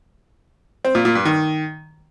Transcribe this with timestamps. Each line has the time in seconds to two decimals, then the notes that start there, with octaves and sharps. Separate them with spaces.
0.85 C4
0.95 A#2
1.05 A#2
1.15 G2
1.25 D#3